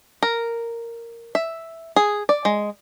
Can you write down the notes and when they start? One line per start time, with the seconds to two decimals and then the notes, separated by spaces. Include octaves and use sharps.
0.23 A#4
1.35 E5
1.96 G#4
2.29 D5
2.45 G#3